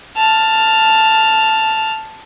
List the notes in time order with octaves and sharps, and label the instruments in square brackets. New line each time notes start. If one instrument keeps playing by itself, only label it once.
[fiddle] A5 F6